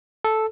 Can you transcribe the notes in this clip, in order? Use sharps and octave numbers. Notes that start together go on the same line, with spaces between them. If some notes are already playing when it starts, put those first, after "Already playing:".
A4